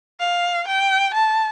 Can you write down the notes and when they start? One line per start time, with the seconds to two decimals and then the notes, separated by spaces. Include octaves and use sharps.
0.20 F5
0.68 G5
1.14 A5